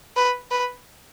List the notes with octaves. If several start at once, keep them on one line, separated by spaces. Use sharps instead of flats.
B4
B4